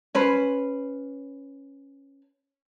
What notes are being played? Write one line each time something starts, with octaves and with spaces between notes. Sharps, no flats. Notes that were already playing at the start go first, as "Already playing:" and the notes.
C#4 B4 C5